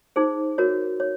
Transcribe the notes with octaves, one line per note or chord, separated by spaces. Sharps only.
D#4 G#4 C5
F#4 A#4 C#5
C#5